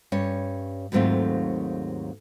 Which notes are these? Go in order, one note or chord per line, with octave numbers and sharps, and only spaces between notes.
G2 C#4 C#5
D#2 G#2 F#3 A3 C4 F4